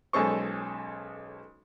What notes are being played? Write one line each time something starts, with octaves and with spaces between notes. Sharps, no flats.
B1 G#3 C#4 A4 C5 C#6